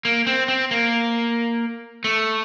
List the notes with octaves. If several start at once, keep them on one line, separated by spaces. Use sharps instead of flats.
A#3
C4
C4
A#3
A3